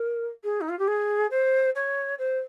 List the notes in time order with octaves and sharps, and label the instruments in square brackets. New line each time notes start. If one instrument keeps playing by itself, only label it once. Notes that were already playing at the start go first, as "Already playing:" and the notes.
Already playing: [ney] A#4
G#4
D#4
F4
G4
G#4
C5
C#5
C5